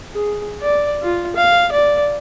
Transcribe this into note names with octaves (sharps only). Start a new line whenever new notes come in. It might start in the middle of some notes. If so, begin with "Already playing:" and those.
G#4
D5
F4
F5
D5